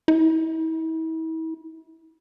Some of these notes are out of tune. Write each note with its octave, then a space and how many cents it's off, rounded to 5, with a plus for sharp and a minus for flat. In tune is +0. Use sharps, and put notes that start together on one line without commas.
E4 -40